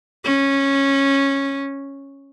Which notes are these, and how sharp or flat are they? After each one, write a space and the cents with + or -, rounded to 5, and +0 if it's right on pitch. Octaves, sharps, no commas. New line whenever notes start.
C#4 -10